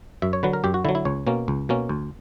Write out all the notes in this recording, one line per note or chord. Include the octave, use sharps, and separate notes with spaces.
F#2 E5
C#5
D3 F#3 B4
A#4
F#2 G4
F#4
D3 F#3 E4
E4
C#2 C#5
B2 A#3 C#4
C#2
B2 A#3 C#4
D2